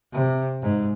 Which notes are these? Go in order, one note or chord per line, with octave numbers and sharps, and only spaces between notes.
C3
G#2